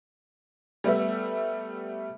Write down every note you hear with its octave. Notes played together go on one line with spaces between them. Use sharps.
G3 A3 B3 E5